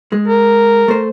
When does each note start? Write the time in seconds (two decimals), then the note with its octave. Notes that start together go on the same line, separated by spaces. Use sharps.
0.12 G#3
0.28 A#4
0.88 A3 C5